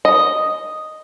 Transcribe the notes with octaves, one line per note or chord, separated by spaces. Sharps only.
D#5